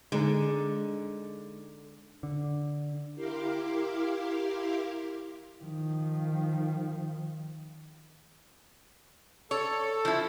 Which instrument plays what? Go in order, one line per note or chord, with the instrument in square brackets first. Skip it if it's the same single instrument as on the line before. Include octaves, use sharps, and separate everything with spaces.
[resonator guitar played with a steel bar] D3 [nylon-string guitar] G#3 D#4
[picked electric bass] D3
[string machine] E4 G4 A#4 F5 C6 D6
[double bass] D#3 F3
[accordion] A4 [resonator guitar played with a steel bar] C#5
[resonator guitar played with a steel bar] F3 E4